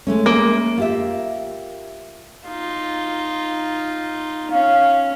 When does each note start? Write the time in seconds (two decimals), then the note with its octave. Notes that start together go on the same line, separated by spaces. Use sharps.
0.07 G#3 A3 C#4
0.26 A#3
0.78 F4 G4 E5
2.48 D#4 F4
4.51 C#4 F5